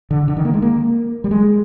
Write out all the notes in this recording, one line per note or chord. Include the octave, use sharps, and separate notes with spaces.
D3
D3
D#3
A#3
G#3
A#3
G3
G#3